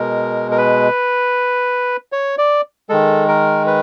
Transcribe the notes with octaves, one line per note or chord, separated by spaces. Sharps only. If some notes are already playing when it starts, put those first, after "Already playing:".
Already playing: B2 G#3 A#4
A#4
B4
C#5
D5
D#3 G#3 A4
A#4
B4